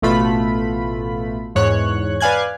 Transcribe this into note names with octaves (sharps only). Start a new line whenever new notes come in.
A1 B2 A3 F4 B5
E2 G#2 C#5 F#6
B4 D5 F5 G#5 F#6 G#6